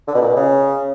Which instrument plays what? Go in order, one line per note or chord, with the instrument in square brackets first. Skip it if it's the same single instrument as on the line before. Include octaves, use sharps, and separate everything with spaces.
[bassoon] D3
B2
A#2
B2
C#3